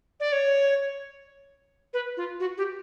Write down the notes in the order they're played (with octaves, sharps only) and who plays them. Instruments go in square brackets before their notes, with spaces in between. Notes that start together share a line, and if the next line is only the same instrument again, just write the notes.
[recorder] D5
C#5
B4
F4
F#4
G4